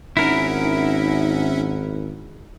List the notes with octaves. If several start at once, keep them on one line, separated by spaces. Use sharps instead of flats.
G#1 C#4 D#4 E4 A#4 E5 F#5